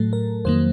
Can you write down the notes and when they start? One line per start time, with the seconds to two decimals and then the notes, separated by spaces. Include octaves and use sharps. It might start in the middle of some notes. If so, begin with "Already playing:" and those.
Already playing: A2 F#3 A3 A4
0.13 A#4
0.45 F2 D#3 F#3 A#3 C5